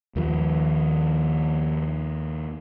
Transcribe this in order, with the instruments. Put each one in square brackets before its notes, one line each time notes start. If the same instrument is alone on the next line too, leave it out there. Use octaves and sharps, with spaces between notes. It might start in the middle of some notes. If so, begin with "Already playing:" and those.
[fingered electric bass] D#2 D#3 F3